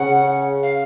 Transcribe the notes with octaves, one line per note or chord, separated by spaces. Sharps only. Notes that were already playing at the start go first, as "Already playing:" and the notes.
Already playing: C#3 F#5
F5